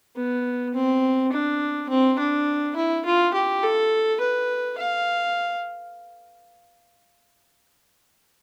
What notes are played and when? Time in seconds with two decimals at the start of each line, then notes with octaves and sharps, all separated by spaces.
0.16 B3
0.74 C4
1.32 D4
1.90 C4
2.19 D4
2.76 E4
3.06 F4
3.34 G4
3.63 A4
4.21 B4
4.78 F5